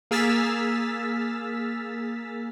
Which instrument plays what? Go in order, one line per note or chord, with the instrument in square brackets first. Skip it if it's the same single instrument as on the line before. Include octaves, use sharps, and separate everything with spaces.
[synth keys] A#3 G#4 E6 F6 A6 B6